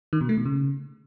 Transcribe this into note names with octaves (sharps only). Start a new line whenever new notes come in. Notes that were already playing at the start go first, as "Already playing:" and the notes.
D#3
B2
A3
B2
C#3